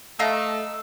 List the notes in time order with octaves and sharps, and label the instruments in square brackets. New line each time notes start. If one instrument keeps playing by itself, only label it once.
[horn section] A3 [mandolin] D#5 F5 A#5 [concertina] E6